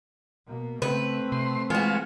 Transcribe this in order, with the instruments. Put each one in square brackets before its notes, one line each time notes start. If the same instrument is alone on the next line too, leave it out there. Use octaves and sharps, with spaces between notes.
[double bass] B2 A#3
[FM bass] C#3 [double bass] A3 C4 [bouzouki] B4
[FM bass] C3 [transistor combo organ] C6
[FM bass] E3 [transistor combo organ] G#3 F4 [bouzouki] B3 F#4